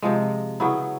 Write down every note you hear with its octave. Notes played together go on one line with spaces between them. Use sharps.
C3 F3 G#3
C#3 F#3 B3 E4